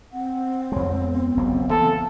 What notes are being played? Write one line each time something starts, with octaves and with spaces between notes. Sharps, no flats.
C4 F#5
F2 G#3 C#5
B3
F#1 B1 F2
E3 A#3 C4 A4